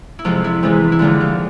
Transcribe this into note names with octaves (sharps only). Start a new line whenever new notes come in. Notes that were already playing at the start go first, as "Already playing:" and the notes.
E4
F2 C3 F3 G#3 F4
E4
E2 C3 E3 G#3
E4
D#2 D3 F3 G#3 F4
F4